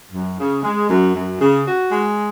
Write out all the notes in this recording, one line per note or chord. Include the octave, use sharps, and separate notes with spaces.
F#2
C#3
G#3
F#2
F#2
C#3
F#4
G#3